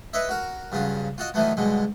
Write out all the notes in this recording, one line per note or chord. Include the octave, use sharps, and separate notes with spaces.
B4 C#5 D#5 E5
F#4 A#4
G2 C#3 F#3 F4
F4 F#4 D#5
D#3 E3 F#3 A3 B3
G2 B2 D3 G#3